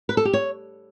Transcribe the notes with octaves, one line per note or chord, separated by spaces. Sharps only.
B4
A4
G4
C#5